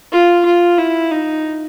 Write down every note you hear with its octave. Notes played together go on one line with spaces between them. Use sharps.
F4
F4
E4
D#4